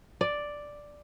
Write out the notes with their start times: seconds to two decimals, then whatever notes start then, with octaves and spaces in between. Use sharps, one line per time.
0.21 D5